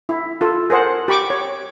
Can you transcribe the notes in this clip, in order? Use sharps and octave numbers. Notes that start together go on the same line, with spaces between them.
E4
F4 A4
G#4 A#4 C5 F#5
G4 B5 C#6 D6
C#5